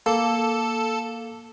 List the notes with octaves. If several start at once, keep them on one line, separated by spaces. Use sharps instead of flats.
A#3 A4